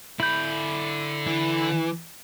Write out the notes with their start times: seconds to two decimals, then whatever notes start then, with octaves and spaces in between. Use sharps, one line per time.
0.20 D3 E4 B5 G6
1.27 E3